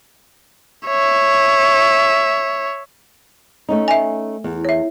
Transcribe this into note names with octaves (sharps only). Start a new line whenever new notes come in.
C#5 E5
A3 C#4 D#4
E5 G#5
E2
C#5 E5